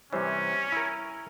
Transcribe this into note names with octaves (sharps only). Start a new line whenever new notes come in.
C3 E3 G3 C#4 C5 C#5
E4 A#4 E5